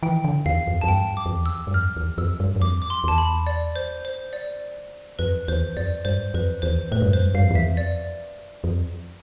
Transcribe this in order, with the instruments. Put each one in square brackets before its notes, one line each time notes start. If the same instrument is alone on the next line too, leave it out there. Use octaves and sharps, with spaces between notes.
[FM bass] E3 [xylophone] G5
[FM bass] D3
[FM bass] E2 [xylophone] F5
[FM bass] F2
[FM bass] F2 [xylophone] A5
[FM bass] G2 [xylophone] G5
[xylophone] D6
[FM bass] F2
E2
[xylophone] E6
[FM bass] G2
[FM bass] F2 [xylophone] F6
[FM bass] E2
[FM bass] F2 [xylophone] E6
[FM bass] G2
G2
[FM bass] F2 [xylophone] D6
[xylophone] D6
C6
[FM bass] E2 [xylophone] A5
[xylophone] B5
D5
C5
C5
D5
[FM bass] F2 [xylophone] B4
[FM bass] E2 [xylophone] C5
[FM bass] F2 [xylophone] D5
[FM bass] G2 [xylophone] C5
[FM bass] F2 [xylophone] B4
[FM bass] E2 [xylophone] C5
[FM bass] A2 [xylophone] B4
[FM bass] G2
[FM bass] F2 [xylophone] C5
[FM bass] G2
[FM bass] G2 [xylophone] F5
[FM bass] F2
E2
[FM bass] F2 [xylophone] E5
[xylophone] D5
[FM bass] F2